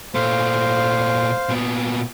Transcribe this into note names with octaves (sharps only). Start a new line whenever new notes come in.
A#2 A3 C5 F5
A#2 B3